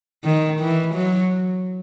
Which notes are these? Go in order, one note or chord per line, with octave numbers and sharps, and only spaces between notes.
D#3
E3
F#3